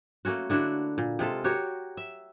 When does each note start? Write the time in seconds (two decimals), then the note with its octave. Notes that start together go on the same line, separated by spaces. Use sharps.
0.25 A3 A#3 C#4 F#4
0.50 D3 D4 E4 F#4
0.98 A#2
1.19 C3 G#3 F4 A4
1.44 F#4 G4 A#4 C#5
1.97 E5